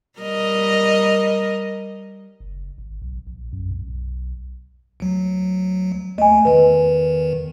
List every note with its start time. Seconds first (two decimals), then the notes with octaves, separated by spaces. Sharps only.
0.19 G3 A#4 D#5
2.40 F#1
2.78 G#1
3.02 B1
3.27 A#1
3.52 F#2
3.71 B1
5.00 D2 F#3
6.18 D#2 A3 D#5 G#5
6.45 E2 D#3 B4